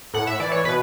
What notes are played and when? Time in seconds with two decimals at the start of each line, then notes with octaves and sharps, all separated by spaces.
0.14 A2 F#5
0.27 E5
0.40 E3 D5
0.52 C#5
0.64 B2 B4